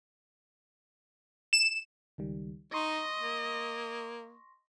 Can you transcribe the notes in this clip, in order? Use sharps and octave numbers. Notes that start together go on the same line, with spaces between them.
E7
C#2 D#3 G3
D#4 D#5 C6 C#6 A#6
A#3